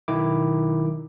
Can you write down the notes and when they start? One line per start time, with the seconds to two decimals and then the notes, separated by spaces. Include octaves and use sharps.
0.08 B1 D#3 E4 D6